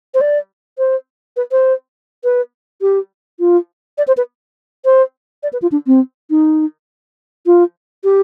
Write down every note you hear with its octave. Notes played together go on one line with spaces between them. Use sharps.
C5
D5
C5
B4
C5
B4
G4
F4
D5
C5
B4
C5
D5
B4
F4
D4
C4
D#4
F4
G4